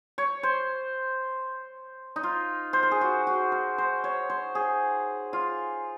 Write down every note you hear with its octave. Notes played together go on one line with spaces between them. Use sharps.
C#5
C5
D#4
F4
C5
A#4
G#4
F#4
F#4
A#4
C5
C#5
C5
G#4
F4